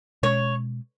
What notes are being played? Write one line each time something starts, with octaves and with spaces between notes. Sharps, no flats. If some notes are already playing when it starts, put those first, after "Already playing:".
B2 G#3 C#4 C#5